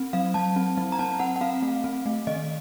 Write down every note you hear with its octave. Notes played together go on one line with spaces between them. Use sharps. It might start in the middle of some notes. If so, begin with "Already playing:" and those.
Already playing: C4
F#3 F5
F#3 A5
C4
F#3
A#5
C4 A5
C4 F#5
F#5
C4 F5
A3
C4
A3
D#3 D#5